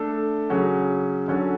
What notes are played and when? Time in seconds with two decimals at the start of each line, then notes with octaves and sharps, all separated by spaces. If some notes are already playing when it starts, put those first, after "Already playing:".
Already playing: A3 D4 A4
0.50 C#3 F#3 C#4 F#4
1.28 D3 F#3 C#4 F#4 A4